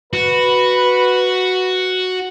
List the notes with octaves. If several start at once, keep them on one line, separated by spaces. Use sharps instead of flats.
F#4 B4